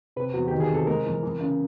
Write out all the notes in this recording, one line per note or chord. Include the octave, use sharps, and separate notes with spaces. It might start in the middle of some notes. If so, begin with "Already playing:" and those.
C3 B4
E2 F#4
D#3 G4
G#4
C3 A4
G#3 A#4
E3
E3
C#3